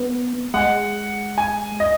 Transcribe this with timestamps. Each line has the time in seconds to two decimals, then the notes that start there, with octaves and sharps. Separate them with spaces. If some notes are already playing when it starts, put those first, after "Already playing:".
Already playing: B3
0.54 G#3 F#5
1.38 G#5
1.80 D#5